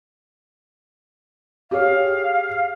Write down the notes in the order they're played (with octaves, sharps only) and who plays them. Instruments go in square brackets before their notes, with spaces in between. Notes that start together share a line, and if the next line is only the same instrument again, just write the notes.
[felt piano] G4 G#4 C#5 [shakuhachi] F5